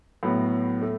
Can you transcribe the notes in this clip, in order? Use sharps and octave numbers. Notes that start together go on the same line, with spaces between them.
A2 F#3 B3
A3